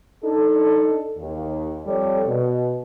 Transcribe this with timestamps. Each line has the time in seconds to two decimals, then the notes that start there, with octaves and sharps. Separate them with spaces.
0.23 D4 D#4 A4
1.18 D#2
1.86 F2 G3 A4 C#5 D5
2.26 B2